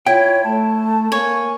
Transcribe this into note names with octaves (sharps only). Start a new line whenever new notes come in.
E4 F4 C#5 G5
A3 A5
A#3 C#5 G#5